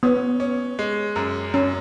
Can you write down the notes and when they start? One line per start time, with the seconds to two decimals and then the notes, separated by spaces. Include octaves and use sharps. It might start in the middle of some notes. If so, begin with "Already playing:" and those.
0.03 B3 C#4
0.40 C#4
0.79 G#3
1.16 F#2
1.54 F#2 C#4